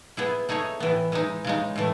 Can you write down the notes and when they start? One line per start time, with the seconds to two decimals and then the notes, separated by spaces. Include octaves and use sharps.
0.17 B3 E4 G#4
0.49 A3 D#4 G#4 C#5
0.80 A2 E3 B3
1.12 E3 G#3 D#4
1.45 C#3 G#3 D#4
1.76 A2 E3 A3